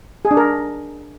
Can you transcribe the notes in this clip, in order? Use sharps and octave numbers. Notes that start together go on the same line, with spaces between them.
G#4
D4
A#4